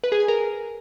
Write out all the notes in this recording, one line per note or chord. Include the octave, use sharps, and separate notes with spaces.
B4
G#4
G#5
A#4